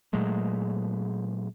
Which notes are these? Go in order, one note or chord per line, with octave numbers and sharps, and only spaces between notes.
A#2 F#3 G#3 A3